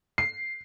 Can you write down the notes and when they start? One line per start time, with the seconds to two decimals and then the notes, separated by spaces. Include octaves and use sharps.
0.18 C7